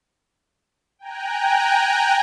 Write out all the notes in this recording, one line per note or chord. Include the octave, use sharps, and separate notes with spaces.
G5 G#5 A#5 F#6